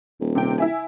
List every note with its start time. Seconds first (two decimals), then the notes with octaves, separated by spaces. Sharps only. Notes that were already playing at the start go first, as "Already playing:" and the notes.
0.20 D#1
0.35 C3 G5
0.58 E4 E5 G#5